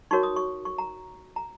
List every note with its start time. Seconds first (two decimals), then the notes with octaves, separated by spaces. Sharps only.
0.11 D#4 F#4 A#4 C#5 C#6
0.23 D#6
0.36 C#6
0.65 C#6
0.78 A#5
1.36 A#5